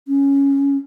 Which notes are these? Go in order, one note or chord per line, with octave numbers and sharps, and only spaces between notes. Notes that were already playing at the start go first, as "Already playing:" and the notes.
C#4